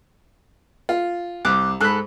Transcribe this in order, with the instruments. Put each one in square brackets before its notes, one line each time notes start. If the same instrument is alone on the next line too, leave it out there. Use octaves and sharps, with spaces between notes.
[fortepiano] F4
[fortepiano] C2 [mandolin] D6 F#6 G6
[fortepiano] G#2 B5 [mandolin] A4 F#6